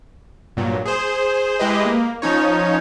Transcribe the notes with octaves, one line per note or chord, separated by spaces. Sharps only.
G2 A#2 F#3
G#4 C5
G#3 E4 G4 G#4 B4 D#5
A#3
F3 C#4 D#4 C#5